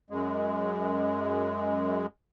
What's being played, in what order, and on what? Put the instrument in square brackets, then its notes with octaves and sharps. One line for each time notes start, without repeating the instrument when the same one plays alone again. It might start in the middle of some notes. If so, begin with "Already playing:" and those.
[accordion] F#2 G#3